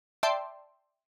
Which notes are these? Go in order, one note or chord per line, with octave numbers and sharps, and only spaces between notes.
D5 E5 G5 A5 C6